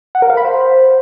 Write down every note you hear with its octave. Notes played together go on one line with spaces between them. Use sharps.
F#5
A#4
F5
B5
C5